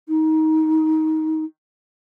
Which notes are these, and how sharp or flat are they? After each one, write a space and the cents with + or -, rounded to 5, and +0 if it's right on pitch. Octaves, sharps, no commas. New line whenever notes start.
D#4 +20